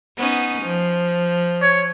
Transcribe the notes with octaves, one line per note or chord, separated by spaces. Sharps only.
B3 C#4 D#4
F3
C#5